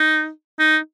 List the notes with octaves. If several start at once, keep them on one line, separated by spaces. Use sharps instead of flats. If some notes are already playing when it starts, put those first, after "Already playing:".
Already playing: D#4
D#4